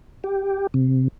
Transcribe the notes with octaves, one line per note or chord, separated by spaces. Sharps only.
G4
C3